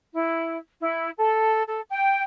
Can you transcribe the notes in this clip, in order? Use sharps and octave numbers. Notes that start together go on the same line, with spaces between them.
E4
E4
A4
A4
G5